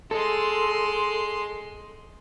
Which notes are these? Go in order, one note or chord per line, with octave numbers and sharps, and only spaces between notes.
G#3 A4 C6